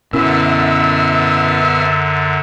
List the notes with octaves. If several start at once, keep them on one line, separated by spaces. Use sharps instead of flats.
F#2 B2 D3 C#4 E4 A#4 E5